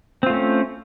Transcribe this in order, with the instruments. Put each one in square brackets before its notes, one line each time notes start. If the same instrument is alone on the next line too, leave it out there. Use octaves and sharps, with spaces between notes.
[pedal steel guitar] C4
F4
A3
C#4